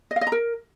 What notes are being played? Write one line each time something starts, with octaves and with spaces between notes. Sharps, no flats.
D#5
F5
D#5
A#5
A#4